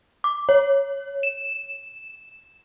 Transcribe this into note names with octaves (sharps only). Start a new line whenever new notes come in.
D6
C#5
E7